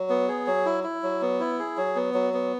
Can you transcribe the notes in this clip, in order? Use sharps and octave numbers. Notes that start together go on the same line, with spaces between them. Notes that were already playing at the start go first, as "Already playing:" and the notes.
Already playing: F#3
B3
G#4
F#3
E4
E4
F#3
B3
E4
G#4
F#3
B3
F#3
B3